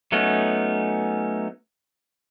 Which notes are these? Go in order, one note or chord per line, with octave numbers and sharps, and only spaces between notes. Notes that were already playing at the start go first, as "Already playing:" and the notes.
F#3 A3 B3 C#4 D#4